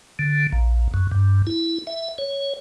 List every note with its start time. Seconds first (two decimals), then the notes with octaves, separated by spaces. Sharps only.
0.19 D3
0.52 A#1
0.94 F#2
1.11 G2
1.47 E4
1.87 E5
2.18 C#5